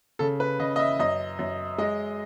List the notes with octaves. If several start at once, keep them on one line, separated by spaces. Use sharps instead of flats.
C#3 A4
B4
C#3 D#5
D#5
E5
F#2 D#5
F#2
G#3 D#5